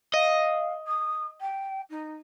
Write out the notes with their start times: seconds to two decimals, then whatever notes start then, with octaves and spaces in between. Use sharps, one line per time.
0.14 D#5 F5
0.87 D#6
1.41 G5
1.90 D#4